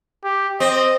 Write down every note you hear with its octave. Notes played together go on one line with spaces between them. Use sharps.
G4
C4 D#5